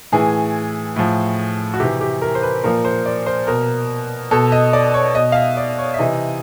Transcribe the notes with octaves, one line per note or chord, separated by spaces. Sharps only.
A2 E3 G#4
A2 F3
F#4
C3 E3 G4
G4
A#4
C5
B4
A#2 F3 A#4
C5
D5
C5
B2 A#4
B2 A4
D#5
D5
C#5
B2 D#5
F5
E5
D5
C#5
E5
C3 E3 D#5